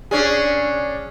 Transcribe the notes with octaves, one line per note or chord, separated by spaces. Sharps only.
C#4 D4 G#4